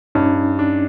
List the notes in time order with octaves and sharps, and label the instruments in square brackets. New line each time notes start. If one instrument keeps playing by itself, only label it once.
[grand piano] G2 [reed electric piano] C#4 D#4
[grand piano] D4